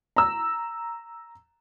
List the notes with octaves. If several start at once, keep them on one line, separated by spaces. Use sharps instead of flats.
A#5 E6